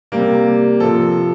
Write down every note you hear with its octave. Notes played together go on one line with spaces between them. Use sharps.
C3 G3 A#3
C3 F3 A4